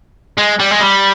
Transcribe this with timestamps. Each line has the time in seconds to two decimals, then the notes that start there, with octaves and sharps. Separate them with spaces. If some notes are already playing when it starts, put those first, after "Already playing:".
0.38 G#3
0.60 G3
0.71 G#3
0.81 G3